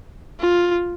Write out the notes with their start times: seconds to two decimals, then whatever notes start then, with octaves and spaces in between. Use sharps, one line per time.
0.40 F4